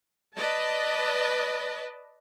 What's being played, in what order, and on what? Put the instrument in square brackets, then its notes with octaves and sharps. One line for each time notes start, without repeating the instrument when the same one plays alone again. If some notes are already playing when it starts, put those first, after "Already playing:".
[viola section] B4 D5 D#5 A5